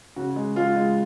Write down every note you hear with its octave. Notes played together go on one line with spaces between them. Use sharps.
C#3 F#4
G#3
G#3 F4
G#3